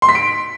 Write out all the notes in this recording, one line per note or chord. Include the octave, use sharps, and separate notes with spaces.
C6
B6
D7